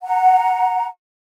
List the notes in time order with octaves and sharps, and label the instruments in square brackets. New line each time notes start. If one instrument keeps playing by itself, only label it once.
[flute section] F#5 A#5